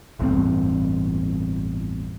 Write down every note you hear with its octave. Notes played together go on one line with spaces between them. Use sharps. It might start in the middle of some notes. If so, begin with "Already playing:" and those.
A1 E2 G2 C4